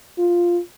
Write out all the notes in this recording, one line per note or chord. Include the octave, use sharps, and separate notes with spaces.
F4